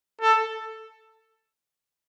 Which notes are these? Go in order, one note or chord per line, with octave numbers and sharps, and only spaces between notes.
A4